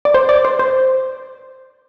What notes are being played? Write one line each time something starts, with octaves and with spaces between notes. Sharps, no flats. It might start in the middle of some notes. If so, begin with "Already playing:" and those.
D5
C5
D5
C5
C5